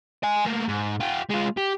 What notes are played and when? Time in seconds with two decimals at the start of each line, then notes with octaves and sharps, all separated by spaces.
0.23 D#5 G#5
0.45 A3 A#3
0.68 G#2
1.00 F4 G4
1.30 G#3 F4
1.58 G4